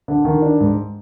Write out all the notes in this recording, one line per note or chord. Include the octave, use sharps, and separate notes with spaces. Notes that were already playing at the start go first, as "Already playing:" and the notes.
D3
D#3
D4
G#2